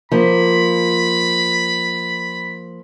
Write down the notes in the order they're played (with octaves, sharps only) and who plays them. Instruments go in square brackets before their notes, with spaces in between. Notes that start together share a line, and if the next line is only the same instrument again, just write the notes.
[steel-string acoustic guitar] F3 A#3 [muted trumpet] B5